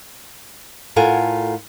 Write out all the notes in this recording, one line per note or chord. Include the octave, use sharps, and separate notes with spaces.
A2 F4 A4 A#4 F#5 G#5